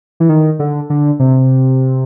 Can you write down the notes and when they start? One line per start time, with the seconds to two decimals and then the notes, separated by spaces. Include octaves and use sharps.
0.20 E3
0.29 D#3
0.59 D3
0.90 D3
1.19 C3